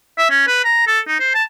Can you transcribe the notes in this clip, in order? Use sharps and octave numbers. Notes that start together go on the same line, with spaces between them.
E5
C#4
B4
A#5
A4
D#4
C5
A5